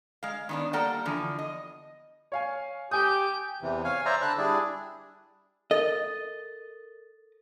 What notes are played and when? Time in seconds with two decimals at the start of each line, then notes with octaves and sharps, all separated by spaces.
0.23 G#3 F5
0.49 D#3 B3 D4
0.73 G3 A#3 A4 F#5 G5
1.05 D3 E3 F3
1.39 D#5
2.32 C#5 F5 G#5
2.91 G4 G5 G#5 D#6 G6
3.62 E2 C3 E3
3.84 C#5 F5 G#5
4.06 C5 D5 E5 A#5
4.22 D3 A5 B5 F#6
4.38 G3 D4 E4 G#4 D5
5.71 A4 A#4 D#5 A6